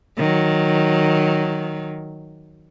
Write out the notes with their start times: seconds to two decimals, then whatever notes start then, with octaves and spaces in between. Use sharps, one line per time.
0.17 D#3 F#3